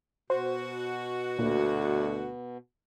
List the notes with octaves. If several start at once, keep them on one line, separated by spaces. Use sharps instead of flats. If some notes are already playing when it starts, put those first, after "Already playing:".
B2 F#4 C5
D2 A#2